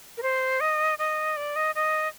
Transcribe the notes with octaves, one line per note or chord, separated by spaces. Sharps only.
A#4
C5
D#5
D#5
D5
D#5
D#5